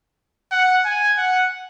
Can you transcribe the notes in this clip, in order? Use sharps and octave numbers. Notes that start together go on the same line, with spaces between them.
F#5
G#5
F#5